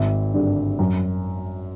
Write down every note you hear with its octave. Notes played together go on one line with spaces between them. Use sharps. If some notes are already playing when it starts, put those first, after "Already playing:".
Already playing: G#1 E5
G2 D3 G3
F#2